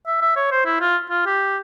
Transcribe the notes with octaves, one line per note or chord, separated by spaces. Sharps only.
E5
E5
C#5
C5
E4
F4
F4
G4